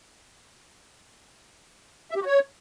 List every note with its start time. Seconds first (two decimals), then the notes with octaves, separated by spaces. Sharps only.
2.11 E5
2.16 G4
2.21 F#4
2.26 C#5